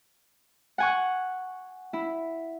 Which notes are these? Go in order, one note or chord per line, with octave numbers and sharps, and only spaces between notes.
F#5 G#5 C#6
E4